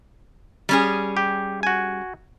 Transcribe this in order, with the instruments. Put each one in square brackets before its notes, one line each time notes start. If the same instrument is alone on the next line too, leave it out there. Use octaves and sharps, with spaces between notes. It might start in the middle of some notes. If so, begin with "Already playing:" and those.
[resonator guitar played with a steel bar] G3 C#4 G#4
[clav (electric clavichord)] G4
F#4 G#5